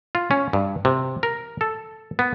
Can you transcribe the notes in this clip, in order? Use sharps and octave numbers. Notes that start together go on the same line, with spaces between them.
F4
C#4
G2
C3
A#4
A4
B3